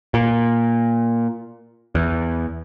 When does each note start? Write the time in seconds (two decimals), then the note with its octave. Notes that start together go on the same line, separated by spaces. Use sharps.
0.14 A#2
1.95 E2